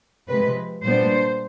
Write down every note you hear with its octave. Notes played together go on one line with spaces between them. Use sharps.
C3 F3 G#3 B4
A#2 G3 B3 D4 C5